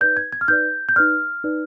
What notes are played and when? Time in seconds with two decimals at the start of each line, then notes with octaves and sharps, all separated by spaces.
0.01 D#4 B4 D5 G6
0.17 G#6
0.32 G#6
0.41 F6
0.48 D#4 B4 D5 G6
0.89 G6
0.96 D#4 B4 D5 F6
1.44 D#4 B4 D5